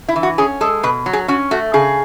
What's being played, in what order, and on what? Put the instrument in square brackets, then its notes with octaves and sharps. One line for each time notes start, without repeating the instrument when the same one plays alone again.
[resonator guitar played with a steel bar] E4
E3
F#4
C#4 G#4
G#3 A4
B2 B4
F#3
G#4
C#4 F#4
A3 F#4
C#3 G#4